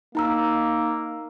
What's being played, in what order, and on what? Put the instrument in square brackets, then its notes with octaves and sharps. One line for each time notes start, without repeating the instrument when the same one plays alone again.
[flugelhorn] A#3 [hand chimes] D#4 A#5 E6